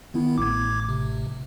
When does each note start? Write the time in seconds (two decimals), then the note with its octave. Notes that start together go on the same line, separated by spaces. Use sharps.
0.14 D#3 B3 E4
0.38 A1 D6 G#6
0.89 C3